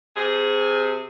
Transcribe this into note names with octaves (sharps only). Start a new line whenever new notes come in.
C3 G#4